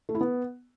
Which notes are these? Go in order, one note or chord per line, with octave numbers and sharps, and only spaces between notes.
A3
E4
B3